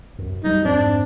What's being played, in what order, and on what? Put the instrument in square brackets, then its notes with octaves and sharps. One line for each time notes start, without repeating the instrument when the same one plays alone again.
[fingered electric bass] B1 F#2
[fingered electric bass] F#3 G3 [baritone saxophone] D#4
[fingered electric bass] F2 G#2 C4 [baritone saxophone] D4